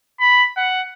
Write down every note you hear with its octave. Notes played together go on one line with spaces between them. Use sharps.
B5
F#5